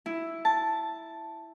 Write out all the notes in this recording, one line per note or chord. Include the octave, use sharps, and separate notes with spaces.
E4
A5